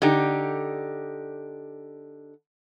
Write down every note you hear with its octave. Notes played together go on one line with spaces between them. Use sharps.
D3 D#4 G4